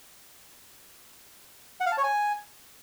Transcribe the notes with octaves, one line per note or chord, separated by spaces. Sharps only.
F#5
F5
A5
C#5
G#5